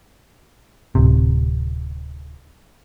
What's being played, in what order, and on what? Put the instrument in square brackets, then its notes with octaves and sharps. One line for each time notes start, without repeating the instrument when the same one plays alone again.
[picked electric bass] D1 C3